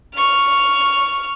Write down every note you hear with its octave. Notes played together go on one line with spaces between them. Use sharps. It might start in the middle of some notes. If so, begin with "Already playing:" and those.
C#6 F6